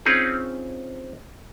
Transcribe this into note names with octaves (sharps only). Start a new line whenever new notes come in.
C4 C#4 D#4 F4 G#4